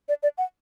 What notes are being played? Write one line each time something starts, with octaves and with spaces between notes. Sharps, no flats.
D5
D5
F#5